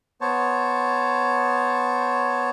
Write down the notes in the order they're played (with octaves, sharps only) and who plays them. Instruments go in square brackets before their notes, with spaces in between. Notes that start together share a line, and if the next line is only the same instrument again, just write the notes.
[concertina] B3 C5 C#5 A5